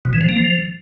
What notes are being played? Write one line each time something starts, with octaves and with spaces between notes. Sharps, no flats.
B2
E3
F3
A#3
F3